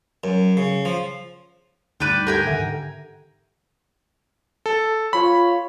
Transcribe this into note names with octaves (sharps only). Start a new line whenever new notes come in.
F#2
C#3
F3
D2 G2 D#4 B4 D5 G5
D4 G4 A4 A#4 G5 G#5
G#2 D3 D#3 A4 E5 F#5
A4
F4 C#5 B5